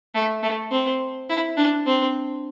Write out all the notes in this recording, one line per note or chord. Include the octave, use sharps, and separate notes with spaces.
A3
A3
C4
E4
D4
C4